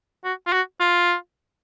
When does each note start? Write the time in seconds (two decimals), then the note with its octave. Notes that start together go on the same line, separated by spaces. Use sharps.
0.24 F#4
0.47 F4
0.53 F#4
0.80 F4